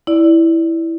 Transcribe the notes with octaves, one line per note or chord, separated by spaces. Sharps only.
E4 D5